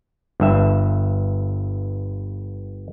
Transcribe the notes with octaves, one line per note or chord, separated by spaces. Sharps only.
G1 G2 E5